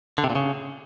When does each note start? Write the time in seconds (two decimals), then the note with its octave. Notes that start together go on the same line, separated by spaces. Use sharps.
0.18 D3
0.24 C3
0.30 A#2
0.35 C#3